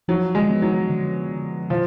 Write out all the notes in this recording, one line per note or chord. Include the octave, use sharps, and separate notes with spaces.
F3 F#3
G#3
B3
F#3
D3
D3
B2 F3